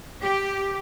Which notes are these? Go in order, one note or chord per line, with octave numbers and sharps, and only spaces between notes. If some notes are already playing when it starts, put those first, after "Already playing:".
G4